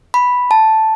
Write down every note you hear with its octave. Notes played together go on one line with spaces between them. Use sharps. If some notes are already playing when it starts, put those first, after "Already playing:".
B5
A5